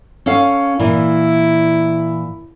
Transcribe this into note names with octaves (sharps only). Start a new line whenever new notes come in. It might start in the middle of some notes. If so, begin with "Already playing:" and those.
C#4 A4 F5
A#2 E3 E4